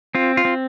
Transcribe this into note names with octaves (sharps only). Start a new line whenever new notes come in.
C4 F4
F4
C4